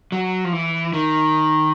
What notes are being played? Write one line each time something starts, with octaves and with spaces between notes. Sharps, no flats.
F#3
F3
E3
D#3